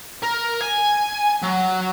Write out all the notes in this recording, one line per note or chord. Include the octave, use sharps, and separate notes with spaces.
A#4
G#5
F#3